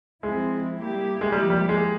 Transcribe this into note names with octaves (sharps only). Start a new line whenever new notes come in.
F3 G#3 C4 E4
G3 A#3 E4 G4
G#3
F3 G3 A#3 E4 G4
G3
G#3